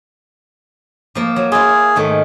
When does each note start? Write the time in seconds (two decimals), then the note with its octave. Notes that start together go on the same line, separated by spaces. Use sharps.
1.15 F3 A#3
1.36 F#3
1.52 E4 F4 G#4
1.96 G#2 D#3 A3